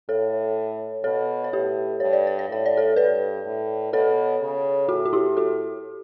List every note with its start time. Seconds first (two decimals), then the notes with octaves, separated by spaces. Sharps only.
0.09 A2 A4 C#5
1.04 B2 A4 C#5
1.44 C#5
1.52 A2 G4 B4
2.00 G2 C#5
2.13 D5
2.27 C#5
2.39 D5
2.49 A2 C#5
2.66 D5
2.77 A4 C#5
2.96 G2 B4 D5
3.45 A2
3.93 B2 A4 C#5
4.41 C#3
4.89 A2 F#4 A4
5.05 F#4
5.13 E4 G4
5.37 F#4 A4